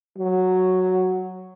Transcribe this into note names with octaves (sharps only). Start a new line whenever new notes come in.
F#3